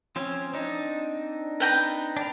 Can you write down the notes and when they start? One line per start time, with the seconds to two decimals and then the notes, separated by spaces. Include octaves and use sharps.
0.16 F3 C4 C#4
0.54 C4 D4 D#4
1.60 B4 G5 A#5
2.17 D4 A#4